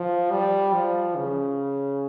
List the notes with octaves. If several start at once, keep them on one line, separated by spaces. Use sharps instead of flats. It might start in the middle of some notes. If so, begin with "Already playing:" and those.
Already playing: F3
G3
F3
C#3